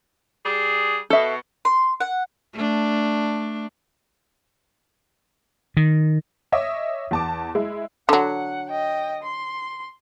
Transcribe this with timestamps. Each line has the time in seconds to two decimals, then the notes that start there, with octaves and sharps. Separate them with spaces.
0.44 G3 G#4
1.10 B2 A4 E5
1.65 C6
2.00 F#5
2.53 A3 D4
5.77 D#3
6.52 C#5 D#5 E5 D6 D#6
7.11 E2 A5 D6
7.55 G#3 E4
8.09 D3 F#3 F#5
8.69 D#5 G5
9.23 C6